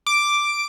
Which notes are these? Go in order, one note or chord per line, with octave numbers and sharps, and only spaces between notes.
D6